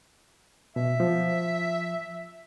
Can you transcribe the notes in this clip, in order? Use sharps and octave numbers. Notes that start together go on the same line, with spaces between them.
B2 E5
F3